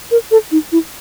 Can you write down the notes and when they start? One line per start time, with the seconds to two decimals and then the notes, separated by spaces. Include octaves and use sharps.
0.11 A#4
0.31 A4
0.51 D#4
0.72 E4